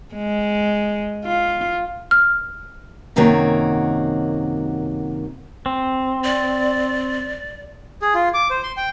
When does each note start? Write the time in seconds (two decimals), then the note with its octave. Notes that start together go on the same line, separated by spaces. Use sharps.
0.15 G#3
1.25 F4
2.11 F6
3.16 F#2 C3 D#3 A#3 F#4 C#5
5.66 C4
6.24 D5
8.02 G#4
8.15 F4
8.34 D6
8.50 C5
8.63 C6
8.77 G5